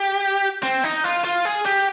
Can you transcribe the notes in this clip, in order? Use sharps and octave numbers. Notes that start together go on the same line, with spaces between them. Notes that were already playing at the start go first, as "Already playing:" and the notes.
Already playing: G4
C4
D#4
F4
F4
G#4
G4